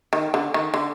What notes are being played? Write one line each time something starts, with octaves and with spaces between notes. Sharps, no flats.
D#3
D3
D#3
D3